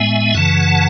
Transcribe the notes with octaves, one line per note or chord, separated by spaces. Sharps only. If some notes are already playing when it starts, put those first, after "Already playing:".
Already playing: A2 G#3 B3 E5 G#5
F#2 C#3 E3 F#5 A5